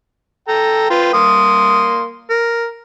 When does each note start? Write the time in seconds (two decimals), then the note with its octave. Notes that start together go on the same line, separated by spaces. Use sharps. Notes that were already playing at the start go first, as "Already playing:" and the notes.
0.48 A4 G5 A#5
0.90 F4 B4 G5
1.14 A#3 C6 D#6
2.30 A#4